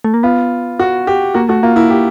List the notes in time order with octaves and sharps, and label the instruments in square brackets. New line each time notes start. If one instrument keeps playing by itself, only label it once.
[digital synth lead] A3
A#3
[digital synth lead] B3 [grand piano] F4
[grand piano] F#4
G4
[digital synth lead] A#3 [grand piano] F#4
[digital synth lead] A3 [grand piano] F#4
[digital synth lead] A#3 [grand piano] F4
[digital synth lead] A#3 [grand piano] E4
[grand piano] G4